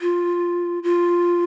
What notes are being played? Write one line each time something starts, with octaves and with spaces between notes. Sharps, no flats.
F4
F4